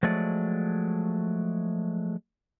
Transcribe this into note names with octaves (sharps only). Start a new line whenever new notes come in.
F3 F#3 G#3 A3 D5